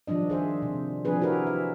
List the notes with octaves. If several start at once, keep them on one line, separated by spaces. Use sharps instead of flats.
D#3 F3 G3 D4 D#5
G#4 C5 E5
C3
F3 C4 D4 G#4 B4
E4 F#4 G4 A#4 B4
E5